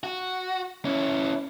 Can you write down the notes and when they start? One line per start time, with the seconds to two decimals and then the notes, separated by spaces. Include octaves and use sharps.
0.04 F#4
0.85 C#4 E4